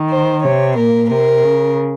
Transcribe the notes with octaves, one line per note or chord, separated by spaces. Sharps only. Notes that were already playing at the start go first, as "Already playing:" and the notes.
Already playing: D#3
C5
C3 C#5
A#2 A#4
C3 A#4
C#3